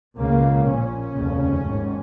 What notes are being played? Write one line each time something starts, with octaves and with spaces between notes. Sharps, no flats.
C#2 C#3 A#3
A#1 A#2 C#4
F1 D#2 C#3
G#1 G#2